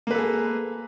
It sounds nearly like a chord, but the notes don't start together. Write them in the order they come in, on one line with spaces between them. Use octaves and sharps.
A#3 B4 A4 G#4